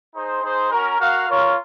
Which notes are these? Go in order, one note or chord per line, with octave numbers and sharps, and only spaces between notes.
D#4 G#4 C5
D#4 G#4 C5
C#4 F#4 A#4
F#4 A#4 F5
F4 A#4 C#5